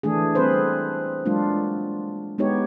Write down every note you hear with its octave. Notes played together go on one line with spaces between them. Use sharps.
E3 A3 D4 G#4
G3 C4 G#4 A4 B4 C5
F#3 G#3 A#3 D4 F4
G#3 B3 D#4 G4 C#5